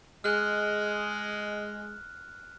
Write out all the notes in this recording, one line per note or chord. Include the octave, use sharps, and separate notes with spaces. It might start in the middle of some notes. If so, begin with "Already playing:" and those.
G#3 F6 F#6